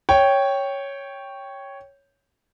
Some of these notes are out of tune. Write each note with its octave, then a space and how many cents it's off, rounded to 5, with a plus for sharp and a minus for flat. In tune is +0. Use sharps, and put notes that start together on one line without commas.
C#5 +0 G5 +0